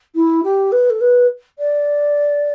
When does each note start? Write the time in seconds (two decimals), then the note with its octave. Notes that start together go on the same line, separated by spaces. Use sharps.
0.15 E4
0.43 G4
0.72 B4
0.90 A4
1.01 B4
1.59 D5